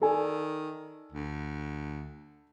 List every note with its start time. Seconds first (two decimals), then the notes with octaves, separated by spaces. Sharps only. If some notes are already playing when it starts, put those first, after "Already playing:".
0.01 D#3 A4 D5 G#5
1.12 D2